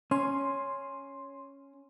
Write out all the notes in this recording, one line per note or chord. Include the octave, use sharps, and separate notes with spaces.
C#4 C6